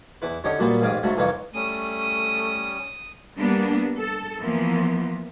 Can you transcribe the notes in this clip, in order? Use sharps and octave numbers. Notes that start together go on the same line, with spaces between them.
E2 E4 B4
D3 C#4 D#4 G4 C#5
A#2 F#3 G3 A#3 B3
A1 G#2 G#4 F5 D6 D#6
G#2 C#3 F#3 A3
C2 F2 E3 D#4 F4 C#5
G3 A3 C#4 D#6
G3 A#3 B3 D4
A4
E3 F3 A#3 B3